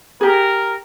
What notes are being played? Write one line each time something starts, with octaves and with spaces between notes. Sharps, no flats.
G4 G#4 A#4